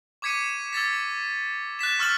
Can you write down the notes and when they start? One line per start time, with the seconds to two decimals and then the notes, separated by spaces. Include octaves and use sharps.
0.22 C#6 D6 G#6 B6 C#7 D#7
0.73 E6 G#6 A6 B6
1.79 F#6 A6 B6 E7
1.99 C#6 E6 F6 A6 B6 F#7